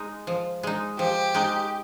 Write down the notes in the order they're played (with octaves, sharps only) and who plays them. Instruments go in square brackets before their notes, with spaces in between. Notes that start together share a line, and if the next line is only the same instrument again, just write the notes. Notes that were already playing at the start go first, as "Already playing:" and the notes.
Already playing: [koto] G#3 D#4
F3
G#3 D#4
[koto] F3 [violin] G4
[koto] G#3 D#4